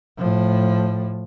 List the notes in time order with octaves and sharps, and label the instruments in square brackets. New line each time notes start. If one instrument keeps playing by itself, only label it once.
[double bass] A2 F3